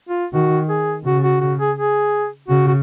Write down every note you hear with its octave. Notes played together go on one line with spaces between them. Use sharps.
F4
D#3 F#4
G#4
C#3 F#4
F#4
F#4
G#4
G#4
C#3 F#4
F#4